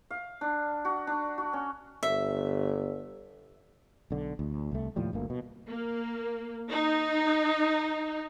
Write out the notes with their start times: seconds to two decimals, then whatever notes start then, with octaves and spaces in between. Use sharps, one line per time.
0.11 F5
0.41 D4
0.85 F#4
1.07 D4
1.38 F#4
1.53 C#4
2.03 G1 E5
4.11 B1 D3
4.39 D2
4.71 C2 A3
4.96 D#2 A2 F3 G3
5.13 G1 D2 A#3
5.30 B2
5.67 A#3
6.70 D#4